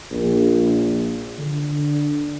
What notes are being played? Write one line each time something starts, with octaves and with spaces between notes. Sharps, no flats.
A#1
D3